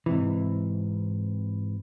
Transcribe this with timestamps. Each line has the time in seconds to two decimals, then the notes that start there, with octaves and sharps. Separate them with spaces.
0.06 G#2 C3 E3